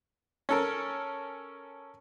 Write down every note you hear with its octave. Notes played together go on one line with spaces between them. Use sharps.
C#4 A4 A#4